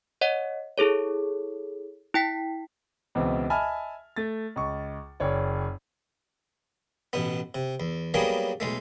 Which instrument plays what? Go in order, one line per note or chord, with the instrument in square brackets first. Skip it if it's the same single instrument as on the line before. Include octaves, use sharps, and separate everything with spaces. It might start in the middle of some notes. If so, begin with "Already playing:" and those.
[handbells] C#5 D#5 F#5
E4 G#4 A4 C#5
E4 G5 B6
[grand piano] C#2 B2 E3 C4
D#5 E5 G#5 A5 B5 F6
A3 A6
C#2 C#6
F#1 C#5 D5
[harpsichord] A1 B2 B3
C3
E2
F#3 G3 A#3 B3 C#4 G#4
B1 G#3 A3